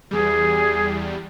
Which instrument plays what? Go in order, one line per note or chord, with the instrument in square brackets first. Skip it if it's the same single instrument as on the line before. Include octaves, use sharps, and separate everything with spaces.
[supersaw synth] E2 G3 [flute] G#4